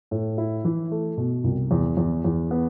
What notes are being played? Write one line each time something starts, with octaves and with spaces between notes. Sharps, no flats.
A2
E4
E3
A3
B2
C2
E2
E2
E2
B3